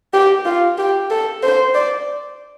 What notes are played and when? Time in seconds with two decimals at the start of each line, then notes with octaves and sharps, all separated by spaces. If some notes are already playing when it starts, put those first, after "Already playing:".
0.13 G4
0.45 F4
0.78 G4
1.10 A4
1.43 C5
1.75 D5